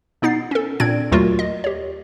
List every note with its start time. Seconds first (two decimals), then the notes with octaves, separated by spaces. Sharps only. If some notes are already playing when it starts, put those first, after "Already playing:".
0.22 B2 B3 D#4 A6 C7
0.51 C#4 A4
0.80 A#2 C4 D4 D5 G#6 D7
1.12 D#2 F#3 A3 F4 F#4 A#4
1.39 D#5
1.64 G4 C#5